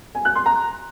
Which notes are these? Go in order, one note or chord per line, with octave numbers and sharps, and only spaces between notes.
G#5
F#6
C6
A#5